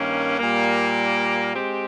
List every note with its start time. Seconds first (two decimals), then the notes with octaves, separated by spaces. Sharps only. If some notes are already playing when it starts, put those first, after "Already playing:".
Already playing: G2 D#3 A#3 C#4
0.38 A#2 G3 A#3
1.55 G#3 C4 G4